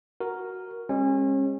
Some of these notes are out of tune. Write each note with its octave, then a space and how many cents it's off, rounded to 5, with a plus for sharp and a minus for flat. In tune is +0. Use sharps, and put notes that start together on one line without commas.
F#4 +0 A#4 +0
G#3 -40 C#4 -35